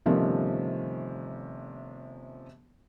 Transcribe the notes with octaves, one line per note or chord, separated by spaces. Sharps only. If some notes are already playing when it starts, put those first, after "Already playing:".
G1 C3 D#3 F3 A3 C#4